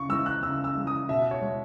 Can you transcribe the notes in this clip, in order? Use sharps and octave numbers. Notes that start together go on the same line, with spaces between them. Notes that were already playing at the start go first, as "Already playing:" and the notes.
Already playing: C#3 C#6
E3 G#3 E6
F#6
C#3 E6
E6
E3 G#3
D#6
B2 E5
C#5
G#3